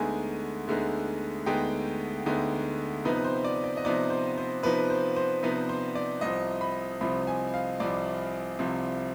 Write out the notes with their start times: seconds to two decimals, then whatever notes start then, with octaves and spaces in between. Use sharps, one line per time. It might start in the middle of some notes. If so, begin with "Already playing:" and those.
Already playing: D2 D3 G#3 B3 D#4 G#5
0.67 D2 D3 G#3 B3 D#4
1.46 D2 D3 G#3 B3 D#4 G5
2.26 D2 D3 G#3 B3 D#4
3.05 C3 F3 B3 D#4 B4
3.24 C5
3.45 D5
3.64 D5
3.77 D#5
3.85 C3 F3 B3 D#4 D5
4.10 C5
4.38 C5
4.63 C3 F3 B3 D#4 B4
4.90 C5
5.16 C5
5.43 C3 F3 B3 D#4 B4
5.69 C5
5.95 D5
6.21 C2 C3 F3 D#5
6.61 B5
7.01 C2 C3 F3 B5
7.27 G#5
7.54 F5
7.80 C2 C3 F3 D5
8.59 C2 C3 F3